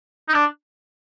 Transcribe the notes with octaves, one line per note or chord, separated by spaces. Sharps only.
D#4
D4